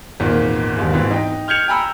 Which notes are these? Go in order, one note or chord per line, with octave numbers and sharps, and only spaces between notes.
G#1 E2 A#2 D#3
A#1 D#2 G#2
G#2 B2 E3 C4
D#4 G5
F6 G6 G#6 C#7 F7
G5 G#5 A#5 B5 E6